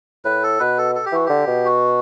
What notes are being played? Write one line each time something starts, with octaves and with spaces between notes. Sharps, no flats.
A2 B4
A4
B2 B4
A4
A4
G4
E3 F#4
D3 G4
B2
F#4